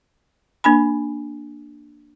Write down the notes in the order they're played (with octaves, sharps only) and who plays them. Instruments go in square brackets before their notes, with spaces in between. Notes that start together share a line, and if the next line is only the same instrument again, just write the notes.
[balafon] A#3 D4 G#5 B5